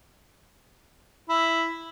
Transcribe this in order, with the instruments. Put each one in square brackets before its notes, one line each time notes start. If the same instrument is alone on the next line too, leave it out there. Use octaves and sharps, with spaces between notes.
[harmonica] E4